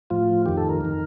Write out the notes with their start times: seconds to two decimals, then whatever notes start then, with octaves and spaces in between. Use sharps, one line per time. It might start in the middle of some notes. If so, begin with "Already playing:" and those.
0.10 A2 F3 F4
0.46 F2 D#3 G4
0.57 A4
0.69 A#4
0.81 F2 D#3